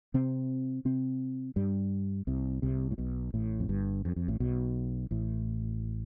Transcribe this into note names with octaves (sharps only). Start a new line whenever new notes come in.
C3 C4
C3 C4
G2 G3
C2 C3
C2 C3
A2
B1 B2
A1 A2
F2
G1 G2
F2
F2
A1 A2
B1 B2
A1 A2